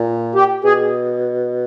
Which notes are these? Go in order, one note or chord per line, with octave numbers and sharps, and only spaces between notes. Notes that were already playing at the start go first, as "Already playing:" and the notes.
Already playing: A#2
G4
B2 G#4